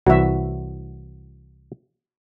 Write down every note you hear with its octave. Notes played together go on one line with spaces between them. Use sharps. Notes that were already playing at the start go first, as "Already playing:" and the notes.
C2 E3 F#4 E5